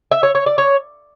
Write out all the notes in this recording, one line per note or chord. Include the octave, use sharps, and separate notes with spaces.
E5
C#5
C#5
D5
C#5